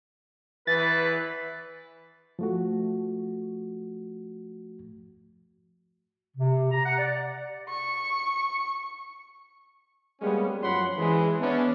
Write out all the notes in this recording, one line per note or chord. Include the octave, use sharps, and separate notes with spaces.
E3 B4 A6
F3 A3 F#4
C3
A#5
F#5
D5
C#6
G3 G#3 A#3 B3 C#4
F#2 F3 C#5 F#5 B5 C6
E3 G#3
B3 C#4 D4